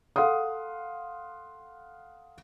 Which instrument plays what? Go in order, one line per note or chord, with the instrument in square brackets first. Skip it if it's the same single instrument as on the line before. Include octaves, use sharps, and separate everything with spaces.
[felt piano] A4 F5 F#5 C6 D#6